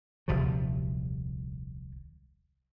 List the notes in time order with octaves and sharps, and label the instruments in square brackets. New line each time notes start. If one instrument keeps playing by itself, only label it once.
[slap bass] D#1 C2 F3 F#3